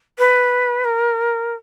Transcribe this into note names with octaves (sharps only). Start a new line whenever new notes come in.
B4
A#4